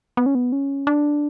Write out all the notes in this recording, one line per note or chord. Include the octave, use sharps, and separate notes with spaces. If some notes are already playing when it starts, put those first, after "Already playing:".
B3
C#4
B3
C#4
D4